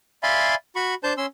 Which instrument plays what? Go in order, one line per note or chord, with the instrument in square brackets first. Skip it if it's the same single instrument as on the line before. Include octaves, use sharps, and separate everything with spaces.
[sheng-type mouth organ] D5 E5 F5 G#5 B5 C6
F#4 B5 C#6
D4 C5 A5 G6
C#4 C6 E6